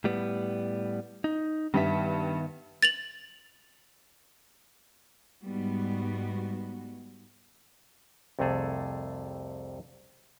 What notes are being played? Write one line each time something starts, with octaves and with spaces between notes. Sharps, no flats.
A2 G3 B3
D#4
G2 D#3 B3 E5
A6 F7 F#7
G#2 G3 B3 F#4
C2 F2 C3 A3 G#4 A4